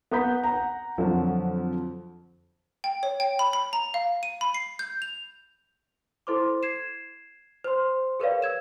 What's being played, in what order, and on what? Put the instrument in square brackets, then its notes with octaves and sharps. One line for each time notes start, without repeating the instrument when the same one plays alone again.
[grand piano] B3 A#5 D#6 G6 B6
F#5 A#5
F2 D3 F3 F#3
[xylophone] G5
C#5
G5
B5
B5
A#5
F5
D#7
B5
C7
G6
F7
[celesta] E4 A4 C5 C6 D6
G#6 C7 E7
C5 C6
G#4 A#4 B4 C#5 D5 F5
E6 G#6 E7